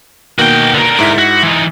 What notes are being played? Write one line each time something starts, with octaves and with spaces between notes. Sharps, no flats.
B2 D#3 A#3 F#4 G5
D3 A#4
G#2 E4 B6
F#4
E3 D#4